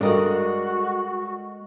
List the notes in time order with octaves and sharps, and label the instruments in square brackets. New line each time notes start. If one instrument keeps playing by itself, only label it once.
[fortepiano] G2 D#5 D#6 [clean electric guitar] G#3 [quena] F#4 [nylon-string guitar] A4 A#4 D5